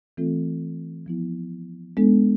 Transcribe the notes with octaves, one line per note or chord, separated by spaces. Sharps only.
E3 A3 C4 F4 A4
F3 B3 E4
G#3 B3 D4 A4